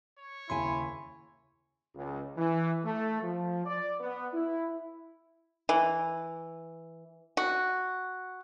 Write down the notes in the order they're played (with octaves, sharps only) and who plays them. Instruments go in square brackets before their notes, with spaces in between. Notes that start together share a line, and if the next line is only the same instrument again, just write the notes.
[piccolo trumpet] C#5
[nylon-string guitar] D#2 C#3 G#5 [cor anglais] E4 [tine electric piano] C6
[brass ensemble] C#2
E3
A3
F3
D5
B3
E4
[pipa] E3
F#4